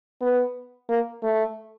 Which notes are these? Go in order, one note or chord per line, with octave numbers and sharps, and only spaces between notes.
B3
A#3
A3